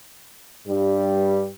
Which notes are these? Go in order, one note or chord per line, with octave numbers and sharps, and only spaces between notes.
G2 G3